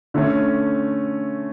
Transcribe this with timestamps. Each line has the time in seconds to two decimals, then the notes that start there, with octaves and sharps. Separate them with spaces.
0.14 D3 A3 C#4